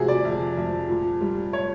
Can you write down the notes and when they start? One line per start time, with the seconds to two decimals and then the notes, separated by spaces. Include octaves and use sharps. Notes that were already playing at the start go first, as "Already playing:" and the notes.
Already playing: C3 F3 F#4 G#4
0.08 D5
0.25 F2
0.57 F2
0.89 A#2
1.21 G3
1.53 C#5